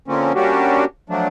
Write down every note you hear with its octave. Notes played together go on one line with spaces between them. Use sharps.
D3 F3 A#3 C4 C#4
G3 A#3 C#4 D4 F#4 G4
F3 F#3 A3 D4